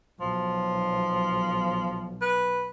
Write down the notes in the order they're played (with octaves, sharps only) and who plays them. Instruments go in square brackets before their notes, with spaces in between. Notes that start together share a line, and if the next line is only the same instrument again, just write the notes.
[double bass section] B1 [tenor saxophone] F3
[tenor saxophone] B4